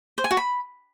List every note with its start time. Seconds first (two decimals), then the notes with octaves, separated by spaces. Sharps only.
0.18 C5
0.24 G#5
0.31 F#4
0.37 B5